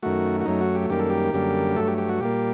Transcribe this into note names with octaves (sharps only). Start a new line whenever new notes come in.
F#2 D#3 A3 F#4
F#4
F#2 F#3 A3 D#4
F#4
G4
F#2 D#3 G3 A#3 G4
A4
G4
F#2 D3 G3 A#3
G2 F#3 A3 A4
G4
G4
F#4
A#2 G3 A#3 G4